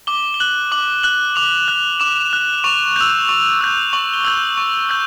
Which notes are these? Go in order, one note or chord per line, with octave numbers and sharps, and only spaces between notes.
D6 G7
G7
F#6 F#7
D6 F#7
F#6 F#7
D6 F7
F#6
D6 E7
F#6
C#6 F7
E6 G6 F7
C#6
E6 G6
C#6 F#7
G7
E6 G6
C#6
E6 G6